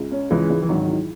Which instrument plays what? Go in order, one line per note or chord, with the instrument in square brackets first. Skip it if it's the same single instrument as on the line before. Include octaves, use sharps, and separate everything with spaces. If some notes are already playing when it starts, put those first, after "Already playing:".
Already playing: [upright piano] C#2
C#4
[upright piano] C#2 [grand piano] E3 G#3
[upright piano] C#2
[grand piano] E3
[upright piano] G#1 [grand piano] D#3 F#3
[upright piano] E3